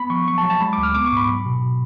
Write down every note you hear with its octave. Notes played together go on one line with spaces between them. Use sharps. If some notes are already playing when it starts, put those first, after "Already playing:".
Already playing: B3 B5
F3 C#6
F#3 C#6
A5
F#3
A5
G#3 B5
D2 D6
F6
B3 D6
C#6
G#2 B5
F#3
B2